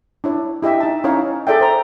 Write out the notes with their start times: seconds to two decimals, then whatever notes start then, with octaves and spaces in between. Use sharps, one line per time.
0.24 D4 E4 C#5
0.63 E4 G4 D#5 E5 G5
0.80 D#4 A5
1.04 C#4 D#4 E4 C#5 F5
1.47 G#4 A4 D5 E5 G5
1.61 C5 A#5